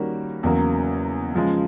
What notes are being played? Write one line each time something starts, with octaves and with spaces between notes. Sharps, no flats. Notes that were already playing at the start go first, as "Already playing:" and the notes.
Already playing: D#3 G3 A#3 C#4 F#4
E2 C#3 F#3 A#3
C#3 F3 G#3